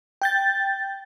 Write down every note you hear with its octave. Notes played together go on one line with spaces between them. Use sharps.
G5 G6 A6